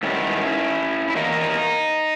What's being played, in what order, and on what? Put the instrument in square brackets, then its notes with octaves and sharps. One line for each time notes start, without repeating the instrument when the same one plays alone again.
[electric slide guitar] G#2 D#3 G3 B3 C#4 E4
E4
E2 D#3 A#3 D#4